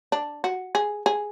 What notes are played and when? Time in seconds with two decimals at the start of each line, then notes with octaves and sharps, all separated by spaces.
0.12 D4
0.44 F#4
0.75 G#4
1.06 G#4